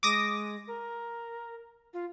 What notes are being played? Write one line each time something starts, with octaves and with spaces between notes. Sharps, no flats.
G#3 D6 D#6 A#6
A#4
F4